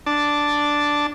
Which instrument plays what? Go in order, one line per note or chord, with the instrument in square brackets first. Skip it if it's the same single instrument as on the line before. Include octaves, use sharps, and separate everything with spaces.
[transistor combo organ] D4 A5